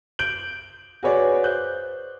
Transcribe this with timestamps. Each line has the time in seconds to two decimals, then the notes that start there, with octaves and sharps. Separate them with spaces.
0.19 G6 D7 F#7
1.03 F#4 G#4 B4 C#5 D5
1.44 C5 F#6 G6